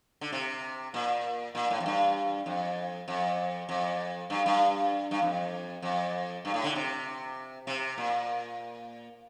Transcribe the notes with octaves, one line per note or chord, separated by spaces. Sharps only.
D3
C3
A#2
A#2
A2
F2
G2
F2
F2
F2
G2
G2
G2
F2
F2
G2
A2
D3
C3
C3
A#2